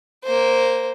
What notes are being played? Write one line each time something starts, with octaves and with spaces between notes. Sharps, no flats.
A#3 C5